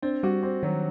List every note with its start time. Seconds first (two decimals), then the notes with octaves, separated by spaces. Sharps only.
0.02 C4 D4
0.23 G3 F#4
0.43 C4
0.63 D#3 F#3